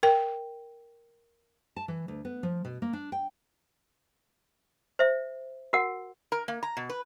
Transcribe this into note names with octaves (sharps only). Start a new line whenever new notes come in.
A#4 G5
A5
E3
D2
B3
F3
B2
A#3
D4
G5
C5 E5
F#4 A#4 F#5
A#4
A#3
A#5
B2
B4